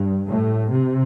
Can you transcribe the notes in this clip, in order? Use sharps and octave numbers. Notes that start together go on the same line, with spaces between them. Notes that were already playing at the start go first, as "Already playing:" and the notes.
Already playing: G2
A2
C3